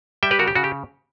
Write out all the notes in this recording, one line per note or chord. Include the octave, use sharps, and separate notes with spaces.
G3 E5 G5
G4 B4
C#3 F#4 A#4
G4
C#3 F#4
G4